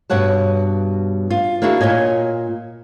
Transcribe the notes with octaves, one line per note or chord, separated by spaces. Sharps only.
G2 B2 C#5 F#5 A5
F4
A#3 D4 E4 F#4 G#4
A#2 C#5 D#5 G#5